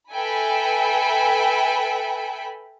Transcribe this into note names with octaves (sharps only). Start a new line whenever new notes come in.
A4 B4 E5 G5 G#5 B5